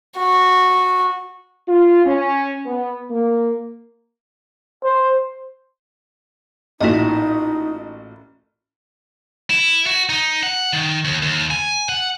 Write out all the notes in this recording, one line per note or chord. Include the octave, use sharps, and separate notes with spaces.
F#4
F4
C#4
B3
A#3
C5
A1 A#2 D#4 E4 F#4 D#5
E4
F#4
D#4
F#5
D#3
D#2
D#2
G#5
F#5